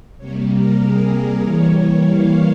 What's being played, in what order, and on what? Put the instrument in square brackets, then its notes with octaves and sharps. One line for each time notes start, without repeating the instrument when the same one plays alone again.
[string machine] C3 G3 A#3 C#5
A#4
G#4
A#4
E3 G3 A#3 C#5
F5